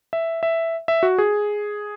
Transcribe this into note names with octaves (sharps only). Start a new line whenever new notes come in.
E5
E5
E5
F#4
G#4